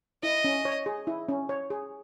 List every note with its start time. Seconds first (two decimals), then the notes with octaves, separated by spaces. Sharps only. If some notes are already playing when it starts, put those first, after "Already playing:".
0.23 E4 D#5
0.44 C#4
0.65 C#5
0.86 G#4
1.07 E4
1.29 C#4
1.49 C#5
1.70 G#4